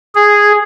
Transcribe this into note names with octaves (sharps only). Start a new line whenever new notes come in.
G#4